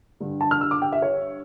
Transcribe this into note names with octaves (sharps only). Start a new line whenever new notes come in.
G2 D3 G3
A5
F6
E6
D6
G5
E5
C#5